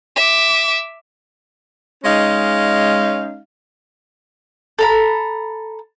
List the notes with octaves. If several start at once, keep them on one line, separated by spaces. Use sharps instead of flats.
E5 D6
G#3 C#4 D#4 F5
A4 A#5 B5